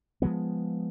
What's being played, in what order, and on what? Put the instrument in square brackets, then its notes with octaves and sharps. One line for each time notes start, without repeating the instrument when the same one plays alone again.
[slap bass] F3 F#3 G#3 B3